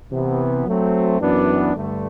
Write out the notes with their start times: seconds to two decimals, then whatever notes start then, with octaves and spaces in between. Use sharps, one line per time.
0.12 C3 E3 B3
0.66 F#3 A3 C4
1.20 F#2 E3 B3 D4
1.75 G2 D3 A3